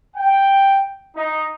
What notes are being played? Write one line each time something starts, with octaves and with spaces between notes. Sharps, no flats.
G5
D#4